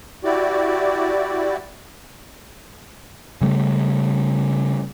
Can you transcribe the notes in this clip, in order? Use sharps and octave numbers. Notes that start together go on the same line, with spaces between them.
E4 F#4 G4 D5
C#3 G3 A3